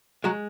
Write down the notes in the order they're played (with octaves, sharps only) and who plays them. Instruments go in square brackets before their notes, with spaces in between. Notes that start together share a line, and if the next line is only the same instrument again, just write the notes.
[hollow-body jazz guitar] F#3 G#3 F#4